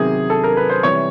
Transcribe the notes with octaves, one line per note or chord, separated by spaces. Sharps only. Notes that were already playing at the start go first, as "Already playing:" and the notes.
Already playing: C3 D#3 F#3 B3 G#4
A4
A#4
B4
C5
C3 E3 G3 C#5